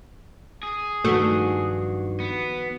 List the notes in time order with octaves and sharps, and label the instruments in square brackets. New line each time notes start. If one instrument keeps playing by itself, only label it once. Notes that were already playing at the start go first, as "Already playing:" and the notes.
[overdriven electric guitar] G#4
[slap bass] G2 [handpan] D#3 F3 F#4 [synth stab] A3
[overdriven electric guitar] B3